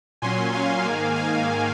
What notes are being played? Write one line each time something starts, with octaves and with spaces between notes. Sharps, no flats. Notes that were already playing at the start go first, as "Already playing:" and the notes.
A#2 F#3 C#4 G#5 C6
F5 G#5
G#2 D#3 A#3
F5 G#5